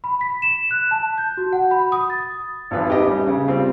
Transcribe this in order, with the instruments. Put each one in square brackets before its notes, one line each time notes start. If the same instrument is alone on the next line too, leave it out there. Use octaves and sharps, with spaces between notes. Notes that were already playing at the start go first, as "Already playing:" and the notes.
[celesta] B5
B6
E7
F#6
A5
G6
F#4
F#5
B5
D#6
A6
[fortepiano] G#1 F3 F4 B4
D#4 G4 B4 D#5 E5
G3 C#4
C#3
G3 C4 F4